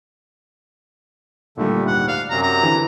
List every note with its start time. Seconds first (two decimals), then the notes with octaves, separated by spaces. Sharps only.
1.57 A#2 D3 D#3 G3 A3
1.87 D2 G#2 F#5
2.08 D5 F5
2.30 F#2 C3 F#3 A#5
2.43 A#5
2.63 D3 E3